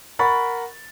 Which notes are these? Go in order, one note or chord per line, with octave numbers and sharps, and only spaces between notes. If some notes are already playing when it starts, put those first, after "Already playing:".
A#4 F#5 B5 C#6 A6